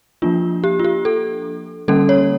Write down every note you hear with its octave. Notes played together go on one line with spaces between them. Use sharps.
F3 A#3 D4 F4
G4
F4
G4
A4
D3 G3 A#3 C#4 A4
C#5